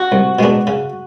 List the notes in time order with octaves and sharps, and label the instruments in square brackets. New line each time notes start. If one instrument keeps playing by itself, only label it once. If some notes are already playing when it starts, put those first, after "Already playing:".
Already playing: [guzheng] F#4
[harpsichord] C2
B2 G#3 B3 D4
C#3